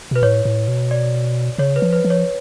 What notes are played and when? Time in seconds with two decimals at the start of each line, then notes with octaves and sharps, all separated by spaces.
0.11 B2 B4
0.23 A2 C#5
0.45 A2
0.68 B2
0.91 D5
1.58 C#3 C#5
1.76 B4
1.82 F3
1.92 B4
2.04 F3
2.10 C#5